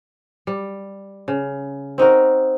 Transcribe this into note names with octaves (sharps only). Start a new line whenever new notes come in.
G3
C#3
C4 D#4 F#4 A#4